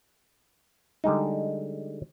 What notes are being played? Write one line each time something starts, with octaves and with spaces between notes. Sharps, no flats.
D3 G3 G#3 D#4